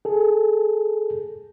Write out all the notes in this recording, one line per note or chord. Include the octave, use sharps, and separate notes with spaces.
G#4 A4